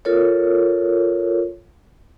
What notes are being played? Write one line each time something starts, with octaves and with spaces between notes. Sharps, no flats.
F4 A4 A#4 C#5